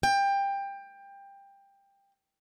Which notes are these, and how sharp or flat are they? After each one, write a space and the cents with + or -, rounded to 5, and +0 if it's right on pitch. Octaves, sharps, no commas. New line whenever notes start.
G5 +20